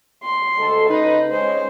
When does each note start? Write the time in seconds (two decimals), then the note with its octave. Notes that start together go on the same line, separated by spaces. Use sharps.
0.23 C6
0.58 D2 G#3 A4
0.89 C#3 D#4 B4
1.31 G#3 C#4 C5